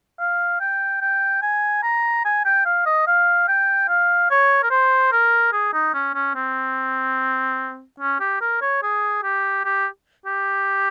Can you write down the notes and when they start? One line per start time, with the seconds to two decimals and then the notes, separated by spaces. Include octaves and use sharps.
0.19 F5
0.60 G5
1.01 G5
1.42 G#5
1.83 A#5
2.25 G#5
2.45 G5
2.66 F5
2.86 D#5
3.07 F5
3.48 G5
3.88 F5
4.31 C#5
4.63 A#4
4.71 C5
5.12 A#4
5.53 G#4
5.73 D#4
5.94 C#4
6.14 C#4
6.35 C4
8.00 C#4
8.20 G4
8.41 A#4
8.62 C#5
8.83 G#4
9.23 G4
9.65 G4
10.26 G4